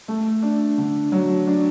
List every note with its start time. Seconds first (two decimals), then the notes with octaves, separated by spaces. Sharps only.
0.08 A3
0.43 D4
0.78 D3
1.12 F#3
1.47 D4